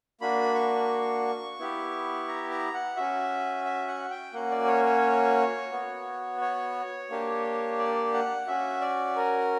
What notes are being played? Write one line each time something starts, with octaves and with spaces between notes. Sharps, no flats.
A#3 D4 F#4 B5
C#6
B3 E4 G4
A#5
A#5
F#5
C#4 F#4 E5
E5
F#5
G5
A#3 C#4 F#4 F#5
D5
C#5
C#5
B3 F#4
C#5
A#3 D4 G4
D5
F#5
C#4 F#4 E5
D5
A#4